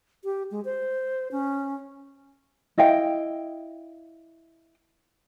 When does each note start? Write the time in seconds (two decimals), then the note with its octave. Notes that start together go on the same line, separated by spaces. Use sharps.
0.24 G4
0.51 G#3
0.65 C5
1.32 C#4
2.78 E4 D#5 F5 G5